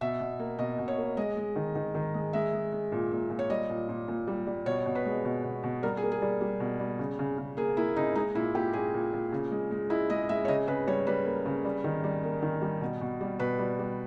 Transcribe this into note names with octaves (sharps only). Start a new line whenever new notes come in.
B2 E5
B2
A#3
B2 D#5
B2
C#5
A#3
G#3 D#5
G#3
D#3
D#3
D#3
G#3
G#3 E5
G#3
G#3
A#2
A#2
A#2
C#5
G3 D#5
A#2
A#2
A#2
G3
G3
B2 C#5
B2
B4
G#3
B2
B2
B2
G3 A#4
G#4
A#3
G#4
G3
G3
B2
G3
C#3
C#3
C#3
A#3 G#4
A#3 E4
C#3 D#4
G#3 D#4
A#2 E4
A#2 G4
A#2 G#4
A#2
A#2
C#3
G#3
G#3
G#3 E4
G#3 D#5
G#3 E5
C#5
C#3 D#5
C#3 B4
G3 C#5
G3 B4
A#3
C#3
G3
D#3
G3
A#3
D#3
G3
B2
B2
G3
B2 B4
G3
G3